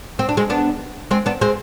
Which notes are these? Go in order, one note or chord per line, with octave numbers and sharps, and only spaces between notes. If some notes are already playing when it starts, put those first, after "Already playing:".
C4
D4
G#3 C4
B3 D4
G#3 C4
B3 D4
G#3 C4